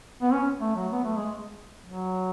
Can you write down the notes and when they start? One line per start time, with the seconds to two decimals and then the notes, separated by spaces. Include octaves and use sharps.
0.21 B3
0.33 C#4
0.61 A3
0.76 F#3
0.92 B3
1.04 A3
1.16 G#3
1.86 F#3